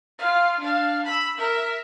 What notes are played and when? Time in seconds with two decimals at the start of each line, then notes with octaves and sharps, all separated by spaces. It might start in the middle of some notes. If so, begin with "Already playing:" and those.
0.19 F4 F5
0.60 D4 F5
1.05 B5 E6
1.37 A#4 E5